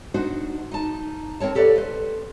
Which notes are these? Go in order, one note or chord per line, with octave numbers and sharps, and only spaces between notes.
D4 D#4 F#4 C5
D#4 A5
C4 A#4 C#5 A5
G4 A4 B4 C#5 D5 F5
B4 C5